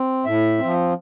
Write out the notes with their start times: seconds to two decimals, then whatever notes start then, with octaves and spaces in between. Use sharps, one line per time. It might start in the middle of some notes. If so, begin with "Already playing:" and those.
Already playing: C4
0.26 A2 E5
0.59 F3 C4